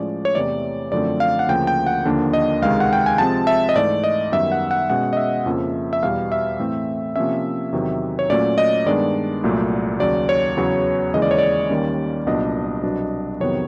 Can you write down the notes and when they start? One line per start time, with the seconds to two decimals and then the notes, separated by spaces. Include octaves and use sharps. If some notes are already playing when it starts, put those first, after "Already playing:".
Already playing: A2 F3 G#3 C#4 D5
0.25 C#5
0.35 E2 C3 E3 A3 D5
0.92 F#2 D3 F3 A3 C4 D5
1.20 F5
1.39 F#5
1.48 D2 C#3 F3 A#3 G5
1.67 G5
1.86 F#5
2.05 D#2 D3 F3 A#3 D4
2.33 D#5
2.62 C#2 C3 D#3 G#3 F5
2.80 F#5
2.93 G5
3.06 G#5
3.18 C3 F3 G#3 C4 A5
3.47 E5
3.69 D#5
3.75 G#2 E3 A3 D5
4.04 D#5
4.32 F#2 D#3 G3 B3 E5
4.52 F#5
4.71 F#5
4.90 B2 G#3 C#4 F#5
5.13 D#5
5.17 E5
5.46 F2 C#3 F3 A#3
5.93 E5
6.03 E2 B2 G3 F5
6.32 E5
6.59 A2 E3 A3 C4
7.16 C3 F3 A#3 C#4 E5
7.72 E2 C3 D#3 F#3
8.19 C#5
8.30 A#2 F#3 A3 C#4 D5
8.58 D#5
8.86 G2 D#3 G#3 B3 D4 D5
9.44 C2 A#2 F#3 A3
10.00 D#2 C#3 F#3 D5
10.29 C#5
10.57 E2 C#3 F#3 B3
11.13 D#2 C#3 E3 G#3 D#5
11.22 D5
11.31 C#5
11.38 D5
11.70 D#2 D#3 G3 A#3 C#4
12.26 C2 A#2 F#3 B3 D4 D#5
12.83 C2 B2 F#3 B3 D4
13.40 F2 C3 D#3 F#3 B3 C#5